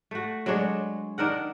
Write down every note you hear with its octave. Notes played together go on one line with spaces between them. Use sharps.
A3 F#4
F#3 G#3 D4 C#5
D#3 D4 A#4 F#5